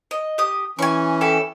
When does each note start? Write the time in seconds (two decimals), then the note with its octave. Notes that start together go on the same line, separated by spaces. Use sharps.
0.11 D#5
0.38 G4 D#6
0.79 E3 C#4 G#5 C#6
1.21 E4 G4 A4